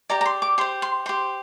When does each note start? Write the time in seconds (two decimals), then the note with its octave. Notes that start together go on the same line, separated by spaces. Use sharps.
0.10 G4 D5 A#5
0.21 A#5
0.26 C6
0.42 D6
0.58 G4 C6
0.61 C5
0.82 C6
1.06 G4 C5 C6